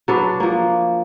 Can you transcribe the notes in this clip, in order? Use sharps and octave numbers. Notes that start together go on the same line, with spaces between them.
F#3 D4 B4
F3 A#3